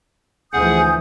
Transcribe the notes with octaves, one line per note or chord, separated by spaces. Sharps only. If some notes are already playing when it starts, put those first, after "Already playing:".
D2 E3 F3 G#4 F#5 G#5 D#6 G6